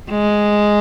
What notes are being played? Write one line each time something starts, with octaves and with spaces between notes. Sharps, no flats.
G#3